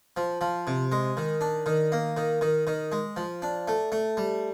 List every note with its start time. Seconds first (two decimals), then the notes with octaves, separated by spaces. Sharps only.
0.17 F3
0.41 F3
0.67 C3
0.92 G#3
1.17 D#3
1.41 D4
1.66 D#3
1.92 A#3
2.17 D#3
2.41 D#3
2.67 D#3
2.92 G#3
3.16 F3
3.42 D4
3.68 A3
3.92 A3
4.17 G3